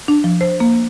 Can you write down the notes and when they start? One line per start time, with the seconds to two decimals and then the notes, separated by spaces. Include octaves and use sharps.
0.08 D4
0.24 F3
0.41 C5
0.60 A#3